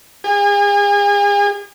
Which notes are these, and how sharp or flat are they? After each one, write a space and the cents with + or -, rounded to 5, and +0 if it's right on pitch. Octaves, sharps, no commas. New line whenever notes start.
G#4 -40